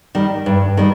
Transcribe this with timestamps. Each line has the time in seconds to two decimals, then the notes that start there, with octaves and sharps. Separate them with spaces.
0.15 D#3 G3
0.46 G2
0.77 D#3 G3